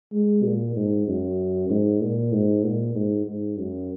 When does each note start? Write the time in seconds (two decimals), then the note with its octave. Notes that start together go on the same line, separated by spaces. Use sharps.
0.13 G#3
0.44 A#2
0.76 G#2
1.07 F#2
1.70 G#2
2.01 A#2
2.32 G#2
2.64 A#2
2.95 G#2
3.27 G#2
3.58 F#2